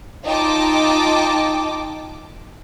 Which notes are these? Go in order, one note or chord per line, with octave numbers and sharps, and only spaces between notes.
D#4 F4 D#5 G5 A5 D6